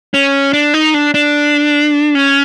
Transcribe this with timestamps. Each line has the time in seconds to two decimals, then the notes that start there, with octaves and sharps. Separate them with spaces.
0.14 C#4
0.53 D4
0.74 D#4
0.94 D4
1.14 D4
2.15 C#4